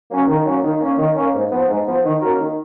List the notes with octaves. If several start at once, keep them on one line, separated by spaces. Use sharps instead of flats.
F#3 A#3 C#4
D#3
F#3 A#3 C#4
D#3
A#3 C#4
D#3
A#3 C#4
G#2
F3 B3
G#2
F3 B3
D#3
A#3 C#4 F#4 A#4
D#3